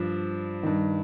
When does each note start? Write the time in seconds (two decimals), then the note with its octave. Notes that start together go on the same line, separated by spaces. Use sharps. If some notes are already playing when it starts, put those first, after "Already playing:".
Already playing: G2 F3
0.63 G2 D#3